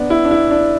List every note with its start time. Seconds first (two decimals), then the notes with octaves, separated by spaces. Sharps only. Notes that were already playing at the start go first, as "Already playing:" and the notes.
Already playing: B3 D4
0.10 E4
0.25 D4
0.31 E4
0.51 D4